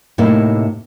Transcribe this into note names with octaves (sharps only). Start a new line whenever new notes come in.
A2 C3 A#3 D#4 E4